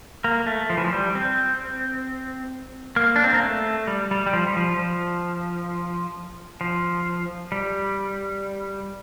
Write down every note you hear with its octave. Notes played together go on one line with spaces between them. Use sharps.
A#3
A3
F3
E3
F3
G3
C4
A#3
D4
C4
A#3
A3
G3
G3
G3
F3
G3
F3
F3
F3
G3